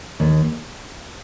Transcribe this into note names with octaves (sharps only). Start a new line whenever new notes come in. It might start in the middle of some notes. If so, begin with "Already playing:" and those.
D#2